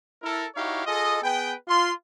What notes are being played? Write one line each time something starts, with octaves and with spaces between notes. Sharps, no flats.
E4 A4 A#4
D#4 E4 F#4 G4 C#5 F5
F4 G#4 A4 D#5
B3 G#4 B4 G5
F4 C6